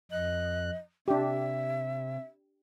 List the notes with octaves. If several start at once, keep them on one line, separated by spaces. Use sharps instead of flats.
F2 D#5 F#6
C3 D4 G4 E5